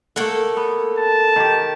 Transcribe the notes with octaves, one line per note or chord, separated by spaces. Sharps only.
A3 A#3 A4 F#5
B3
A5
D#3 G4